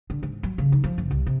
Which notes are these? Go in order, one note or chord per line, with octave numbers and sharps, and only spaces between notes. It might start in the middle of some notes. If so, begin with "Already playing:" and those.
D3
G#2
F#3
C#3
D#4
F3
F#1
C2
C3